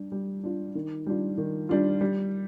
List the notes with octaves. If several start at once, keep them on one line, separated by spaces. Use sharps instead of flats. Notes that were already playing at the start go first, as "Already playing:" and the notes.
Already playing: G3 D4
G3
D4 F4
D#3
G3 D4 F4
D#3
G3 D4 F4
G3